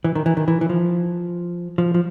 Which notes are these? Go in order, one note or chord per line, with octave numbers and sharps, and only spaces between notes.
E3
D#3
E3
D#3
E3
E3
F3
F3
F3